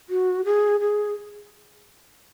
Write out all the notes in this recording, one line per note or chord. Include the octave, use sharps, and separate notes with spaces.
F#4
G#4
G#4